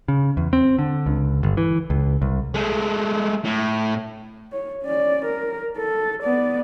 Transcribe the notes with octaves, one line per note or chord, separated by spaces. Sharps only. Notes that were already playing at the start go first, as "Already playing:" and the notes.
C#3
E2
C4
D3
C#2
G1
E3
C#2
C2
G#3 A3
A2
C#5
C#4 D5
A#4
A4
B3 D5